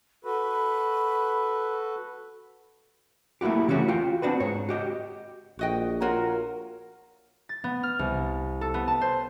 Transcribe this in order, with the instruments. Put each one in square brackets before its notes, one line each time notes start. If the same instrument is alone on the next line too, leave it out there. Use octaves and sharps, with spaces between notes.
[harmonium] F#4 A4 B4 [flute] B5
[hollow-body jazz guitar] A3 A#3 E4 F#4 G4
C#3 E3 C#4 F#4 G4 C#5
F4 F#4 G5
C4 D4 F#4 B4
G#2 C#5
F#4 G4 D#5
[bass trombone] A#1 [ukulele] F#4 D#5 G5
[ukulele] F4 F#4 C#5 [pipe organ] A#4
[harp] A6
B3
F6
C2
A4
B3
A5
C5